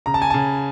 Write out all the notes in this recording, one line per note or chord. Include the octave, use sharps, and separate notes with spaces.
C#3 A#5
A5
G#5
C#3 A5